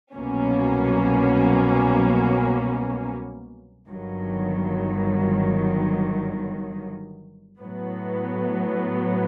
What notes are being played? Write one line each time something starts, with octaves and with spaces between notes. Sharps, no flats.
C2 B2 F#3 A#3 C#4
G1 G2 D#3 F#3
A2 F#3 B3